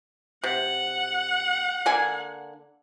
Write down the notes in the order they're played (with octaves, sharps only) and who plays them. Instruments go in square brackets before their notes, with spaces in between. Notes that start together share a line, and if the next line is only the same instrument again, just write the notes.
[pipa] C3 [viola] F#5
[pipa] D3 A#3 G#5